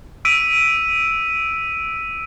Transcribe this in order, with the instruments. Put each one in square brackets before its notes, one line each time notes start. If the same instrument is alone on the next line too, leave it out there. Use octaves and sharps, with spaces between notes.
[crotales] E6 B6 D7 D#7